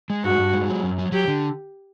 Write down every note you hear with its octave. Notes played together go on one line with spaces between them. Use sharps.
G#3
G2 F#4
G2
G#3
F#3
F#2
F#3
F#3 G4
D3